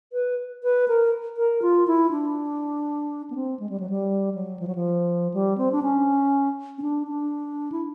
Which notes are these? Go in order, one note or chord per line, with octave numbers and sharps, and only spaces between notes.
B4
B4
A#4
A#4
F4
E4
D4
B3
C4
G#3
G3
F#3
G3
F#3
F3
F#3
F3
G3
C4
D4
C#4
C#4
D4
D4
E4